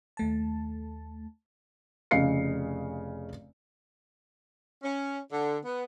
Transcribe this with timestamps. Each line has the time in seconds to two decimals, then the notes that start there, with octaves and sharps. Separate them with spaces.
0.17 D#2 A3 A5
2.11 F1 C#3 D#5 F5 C7 C#7
4.83 C#4
5.31 D3
5.65 B3